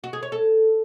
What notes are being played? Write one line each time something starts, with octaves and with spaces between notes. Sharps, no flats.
F#4
G#4
C#5
A4